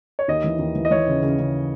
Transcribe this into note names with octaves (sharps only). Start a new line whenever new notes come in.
C#5
D#2 D#5
E3
D#2
E3
D#5
E3 C#5
C#3
C#3
C#3